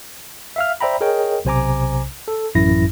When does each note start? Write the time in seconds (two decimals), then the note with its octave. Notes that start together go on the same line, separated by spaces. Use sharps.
0.56 E5 F5 F6
0.80 C5 D5 E5 G5 A#5 B5
1.01 G#4 A#4 C#5 D#5 G5
1.45 B1 C3 C5 G#5 A#5 D6
2.28 A4
2.55 A1 F#2 E4 A#6